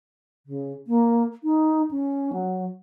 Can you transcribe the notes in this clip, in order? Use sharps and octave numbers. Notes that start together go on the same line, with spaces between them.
C#3
A#3
D#4
C#4
F#3